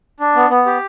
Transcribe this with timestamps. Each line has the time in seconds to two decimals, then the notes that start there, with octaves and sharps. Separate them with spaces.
0.20 D4
0.36 B3
0.50 B3
0.66 G4